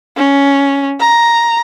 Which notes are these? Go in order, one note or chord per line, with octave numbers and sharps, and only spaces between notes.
C#4
A#5